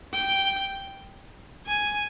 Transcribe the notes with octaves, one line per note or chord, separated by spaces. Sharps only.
G5
G#5